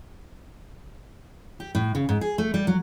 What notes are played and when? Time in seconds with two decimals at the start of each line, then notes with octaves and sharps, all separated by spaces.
1.60 G4
1.75 A2
1.95 C#3
2.09 G#2
2.21 G#4
2.38 A3
2.54 G3
2.67 F#3